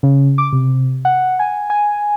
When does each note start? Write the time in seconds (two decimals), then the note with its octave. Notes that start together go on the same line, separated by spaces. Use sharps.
0.03 C#3
0.38 D6
0.53 C3
1.05 F#5
1.39 G#5
1.70 G#5